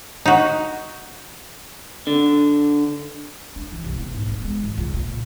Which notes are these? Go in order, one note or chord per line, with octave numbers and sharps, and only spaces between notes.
D#4 F#4
D3
D4
E3
C2
B3
G#2
B3
G#3
G#1
C#2
A#2